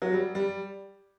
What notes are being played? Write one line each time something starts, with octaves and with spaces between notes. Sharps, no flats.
F#3
G3
G3